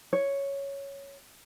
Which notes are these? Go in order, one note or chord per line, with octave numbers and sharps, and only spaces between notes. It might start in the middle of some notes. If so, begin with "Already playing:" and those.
C#5